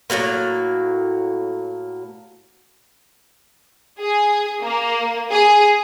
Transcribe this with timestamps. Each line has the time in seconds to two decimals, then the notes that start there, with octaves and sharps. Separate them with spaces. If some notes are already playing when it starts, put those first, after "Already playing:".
0.10 A2 C#3 F#3 A#3
3.99 G#4
4.60 A#3
5.30 G#4